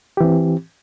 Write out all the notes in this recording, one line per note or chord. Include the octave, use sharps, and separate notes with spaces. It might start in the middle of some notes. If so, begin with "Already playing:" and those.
E3 C4 G4